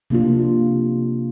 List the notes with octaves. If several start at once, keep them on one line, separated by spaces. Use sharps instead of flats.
C3 A#3 D4 F4